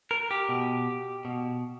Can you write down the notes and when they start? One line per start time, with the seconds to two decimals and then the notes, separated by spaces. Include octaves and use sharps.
0.11 A#4
0.31 G4
0.49 B2
1.25 B2